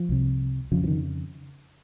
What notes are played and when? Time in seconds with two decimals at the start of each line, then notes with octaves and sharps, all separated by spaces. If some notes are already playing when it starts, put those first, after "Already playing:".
Already playing: F3
0.09 C2 C3
0.72 F2 C#3 F3
0.84 F3
0.87 D#3